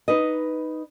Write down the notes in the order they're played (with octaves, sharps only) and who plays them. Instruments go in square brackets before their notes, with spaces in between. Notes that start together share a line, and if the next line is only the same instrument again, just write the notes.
[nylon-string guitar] D#4 B4 D#5